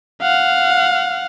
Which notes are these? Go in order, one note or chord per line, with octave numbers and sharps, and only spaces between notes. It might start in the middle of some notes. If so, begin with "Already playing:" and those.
F5 F#5